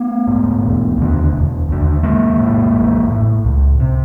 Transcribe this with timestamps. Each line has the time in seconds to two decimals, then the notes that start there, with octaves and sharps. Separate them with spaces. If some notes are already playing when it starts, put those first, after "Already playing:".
Already playing: A3 B3
0.27 G#2
0.63 E1
0.98 D#2 D3
1.33 E1
1.69 D#2 D3
2.04 A1 G#3 A#3
2.39 A2
2.75 A1
3.10 A2
3.45 C#2
3.80 C3